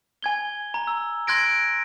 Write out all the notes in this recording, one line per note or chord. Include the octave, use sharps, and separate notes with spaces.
G#5 G#6 G7
A#5
E6
C6 F#6 G#6 A#6 D7